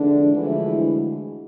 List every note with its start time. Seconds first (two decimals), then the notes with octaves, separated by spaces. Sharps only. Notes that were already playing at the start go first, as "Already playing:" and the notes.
Already playing: F2 D3 E3 G#3 D4
0.31 D2 D3 E3 F3 G#3 E4